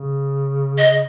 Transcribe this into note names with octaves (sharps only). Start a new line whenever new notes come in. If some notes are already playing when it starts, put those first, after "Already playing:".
Already playing: C#3
D#5